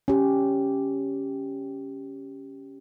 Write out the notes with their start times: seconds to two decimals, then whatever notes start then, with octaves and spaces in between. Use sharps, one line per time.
0.08 C#4 G4